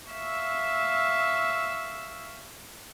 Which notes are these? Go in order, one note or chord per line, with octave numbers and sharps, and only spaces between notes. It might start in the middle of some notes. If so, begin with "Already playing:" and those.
E5 F5 C#6 E6